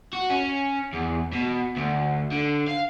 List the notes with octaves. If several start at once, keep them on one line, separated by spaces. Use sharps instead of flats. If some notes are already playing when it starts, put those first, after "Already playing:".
F#4
C#4
E2
B2
D2
D3
F5